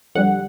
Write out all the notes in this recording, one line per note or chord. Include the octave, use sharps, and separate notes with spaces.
F2 D3 G3 F#5